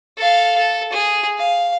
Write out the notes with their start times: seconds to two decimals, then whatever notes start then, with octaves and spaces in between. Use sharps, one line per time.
0.17 A4 F5
0.58 A4
0.92 G#4
1.37 F5